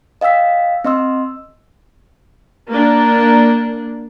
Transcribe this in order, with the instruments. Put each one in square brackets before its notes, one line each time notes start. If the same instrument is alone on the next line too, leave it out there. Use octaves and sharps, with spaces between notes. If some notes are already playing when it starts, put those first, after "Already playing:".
[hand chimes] D#5 F5 G5 E6 B6
C4 D#5 C6 E6
[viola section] A#3 D4